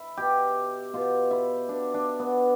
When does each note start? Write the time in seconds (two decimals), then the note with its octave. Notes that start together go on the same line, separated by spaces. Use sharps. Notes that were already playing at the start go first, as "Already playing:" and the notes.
Already playing: E4
0.17 B2 G4
0.93 B2 F4
1.31 E4
1.68 B2 D4
1.94 D4
2.19 B3